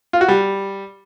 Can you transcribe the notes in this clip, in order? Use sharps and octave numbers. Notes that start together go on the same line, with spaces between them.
F4
F#4
G3